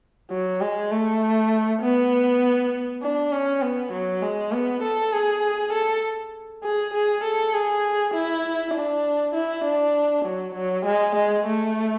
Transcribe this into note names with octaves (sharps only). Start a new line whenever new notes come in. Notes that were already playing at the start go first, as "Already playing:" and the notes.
F#3
G#3
A3
B3
D4
C#4
B3
F#3
G#3
B3
A4
G#4
A4
G#4
G#4
A4
G#4
E4
D4
E4
D4
F#3
F#3
G#3
G#3
A3